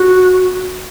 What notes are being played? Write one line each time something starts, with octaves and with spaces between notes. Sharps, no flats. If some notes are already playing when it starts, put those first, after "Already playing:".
Already playing: F#4